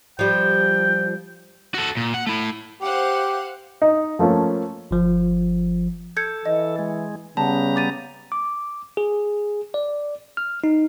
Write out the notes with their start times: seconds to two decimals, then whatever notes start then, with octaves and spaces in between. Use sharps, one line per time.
0.19 F3 G3 G5
1.74 F#4 A4
1.97 A#2
2.14 F#5
2.27 A3 E4
2.81 G4 C5 F5 F#5
3.82 D#4
4.19 F3 A3 A#3 C#4
4.91 G1 F3
6.17 A4 G6 G#6 C#7
6.46 E3 D#5
6.79 G#3
7.37 C#3 G3 B3 F#5 A5 A#5
7.76 D6 A6 D#7
8.32 D6
8.97 G#4
9.74 D5
10.37 F6
10.64 D#4